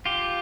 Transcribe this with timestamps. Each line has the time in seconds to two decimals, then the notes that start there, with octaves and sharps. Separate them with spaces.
0.06 F4 G4